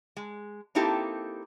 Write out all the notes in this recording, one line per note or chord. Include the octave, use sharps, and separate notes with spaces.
G#3
A#3 C4 D#4 E4 G4 A4